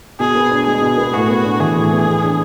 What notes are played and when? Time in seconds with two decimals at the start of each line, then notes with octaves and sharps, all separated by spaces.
0.20 B2 G#4
0.35 B3
0.51 D4
0.66 G#3 G#4
0.82 B2
0.97 B3
1.13 A2 F#4
1.28 B3
1.44 D4
1.60 E3 G#4
1.76 A2
1.91 B3
2.07 E3
2.23 D4